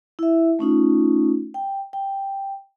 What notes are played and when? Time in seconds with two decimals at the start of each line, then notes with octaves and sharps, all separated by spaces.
0.19 E4 E5
0.59 A3 C#4 D#4 F4
1.54 G5
1.93 G5